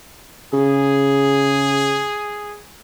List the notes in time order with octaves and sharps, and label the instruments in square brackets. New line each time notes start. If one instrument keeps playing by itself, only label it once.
[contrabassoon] C#3 [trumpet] G#4